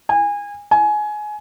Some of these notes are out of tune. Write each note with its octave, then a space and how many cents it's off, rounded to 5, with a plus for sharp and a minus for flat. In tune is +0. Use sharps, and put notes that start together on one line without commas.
G#5 -25
G#5 +20